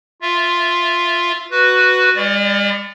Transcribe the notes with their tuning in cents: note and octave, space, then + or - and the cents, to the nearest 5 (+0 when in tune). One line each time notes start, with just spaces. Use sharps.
F4 +0 E5 +10
F#4 +0 B4 +0
G#3 -45 D5 +0